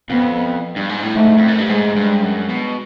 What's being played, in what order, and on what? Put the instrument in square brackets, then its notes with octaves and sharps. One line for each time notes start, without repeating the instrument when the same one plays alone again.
[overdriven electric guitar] F2 [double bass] B3
[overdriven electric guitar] G2
G#2
A2
[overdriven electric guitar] G#2 [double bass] A3
[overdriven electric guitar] F2
F#2
G2
[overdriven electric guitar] G#2 [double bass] G#3
[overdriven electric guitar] G2
F#2
B2